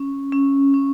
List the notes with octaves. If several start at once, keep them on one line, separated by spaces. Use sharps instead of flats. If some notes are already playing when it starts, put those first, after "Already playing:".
Already playing: C#4
C#4
C#4